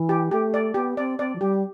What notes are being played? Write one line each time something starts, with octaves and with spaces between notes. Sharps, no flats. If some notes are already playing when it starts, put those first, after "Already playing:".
Already playing: E3
G4
A3 G4
D5
B3 G4
C4 D5
C4 D5
F3
G3 G4